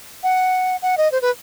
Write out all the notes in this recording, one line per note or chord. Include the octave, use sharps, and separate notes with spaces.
F#5
F#5
D#5
C5
B4